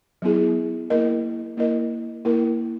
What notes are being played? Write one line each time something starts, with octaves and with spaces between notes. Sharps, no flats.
F#3 B3 E4 G#4
A#3 E4 A#4 D#5
A#3 E4 A#4 D#5
A#3 E4 A#4